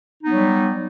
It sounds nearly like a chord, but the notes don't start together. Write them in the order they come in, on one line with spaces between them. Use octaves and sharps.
D#4 B3 F#3 G3